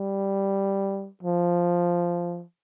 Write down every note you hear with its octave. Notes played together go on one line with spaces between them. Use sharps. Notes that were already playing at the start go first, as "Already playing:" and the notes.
Already playing: G3
F3